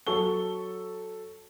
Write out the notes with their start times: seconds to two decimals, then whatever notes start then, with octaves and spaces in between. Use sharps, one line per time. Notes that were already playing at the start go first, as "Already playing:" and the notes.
0.07 F#3 A4 C#6 G7